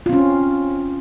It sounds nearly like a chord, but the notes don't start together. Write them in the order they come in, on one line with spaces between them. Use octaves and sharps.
F4 C4 C#4